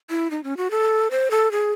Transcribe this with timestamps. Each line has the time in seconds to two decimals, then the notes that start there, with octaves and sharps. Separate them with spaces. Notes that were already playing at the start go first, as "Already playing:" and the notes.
0.10 E4
0.31 D#4
0.44 C#4
0.57 F#4
0.71 A4
1.11 C5
1.31 A4
1.52 G#4